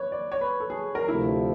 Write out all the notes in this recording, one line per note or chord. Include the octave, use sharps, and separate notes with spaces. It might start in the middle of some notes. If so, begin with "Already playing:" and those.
Already playing: B4 C#5
D5
C#5
B4
A4
G#4
A#4
D2 C3 F3 A3 E4